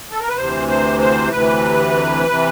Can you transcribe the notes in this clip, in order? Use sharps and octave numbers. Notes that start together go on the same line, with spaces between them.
A4
A#4
B4
D2 C3 E3 C5
C5
C5
D2 C3 E3 B4
C3 E3